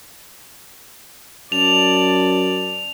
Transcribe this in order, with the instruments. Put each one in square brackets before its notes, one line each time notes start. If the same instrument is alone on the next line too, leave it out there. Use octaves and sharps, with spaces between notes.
[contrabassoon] F#2 [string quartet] D5 A5 [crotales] F7